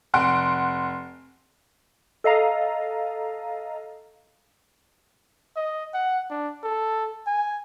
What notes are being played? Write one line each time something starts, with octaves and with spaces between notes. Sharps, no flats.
F1 F#5 C6 D7
A4 D#5 F5 A#5
D#5
F#5
D4
A4
G#5